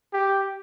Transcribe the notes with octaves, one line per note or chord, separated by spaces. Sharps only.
G4